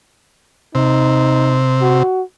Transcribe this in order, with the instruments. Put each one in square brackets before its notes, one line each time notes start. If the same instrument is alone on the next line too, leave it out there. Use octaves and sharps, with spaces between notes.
[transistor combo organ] C3 [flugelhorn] D#4
[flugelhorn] F#4